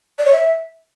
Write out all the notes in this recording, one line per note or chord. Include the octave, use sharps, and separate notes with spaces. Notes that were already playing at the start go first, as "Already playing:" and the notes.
D5
C#5
E5